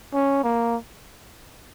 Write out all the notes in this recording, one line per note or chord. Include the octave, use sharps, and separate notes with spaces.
C#4
A#3